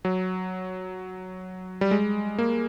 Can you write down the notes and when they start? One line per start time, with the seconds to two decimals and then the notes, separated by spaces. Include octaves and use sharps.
0.05 F#3
1.81 G3
1.91 G#3
2.38 A#3